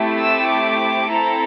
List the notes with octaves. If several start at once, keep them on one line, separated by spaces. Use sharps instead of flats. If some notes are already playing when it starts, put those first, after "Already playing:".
Already playing: A3 C4 E4 G4
E6
D6
C4 E4 A4 A#5